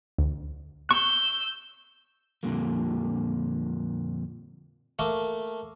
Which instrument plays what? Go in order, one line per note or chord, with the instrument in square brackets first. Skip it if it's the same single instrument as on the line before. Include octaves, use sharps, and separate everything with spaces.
[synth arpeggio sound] D2
[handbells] C#6 F#6 [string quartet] E6 G6
[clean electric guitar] F2 A#2 D3 G3 A#3
[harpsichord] A3 A#3